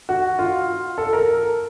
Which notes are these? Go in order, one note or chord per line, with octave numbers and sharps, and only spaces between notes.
F#4
F4
A4
A#4